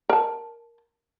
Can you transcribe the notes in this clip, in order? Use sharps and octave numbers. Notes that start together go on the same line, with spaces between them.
A#4 A5